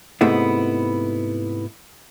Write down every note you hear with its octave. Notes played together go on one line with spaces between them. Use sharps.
G#2 C3 G#3 A3 B3 E4